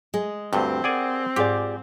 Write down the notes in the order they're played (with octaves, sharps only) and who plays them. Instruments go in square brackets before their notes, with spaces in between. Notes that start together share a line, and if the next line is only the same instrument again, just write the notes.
[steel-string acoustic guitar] G#3 [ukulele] G#4
[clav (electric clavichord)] D2 G2 [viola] C4 [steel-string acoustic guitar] G4
[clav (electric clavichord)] G#4 D5 G#5 [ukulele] A#4 F#5
[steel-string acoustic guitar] G#2 [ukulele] F4 G#4 D5 [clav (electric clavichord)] G4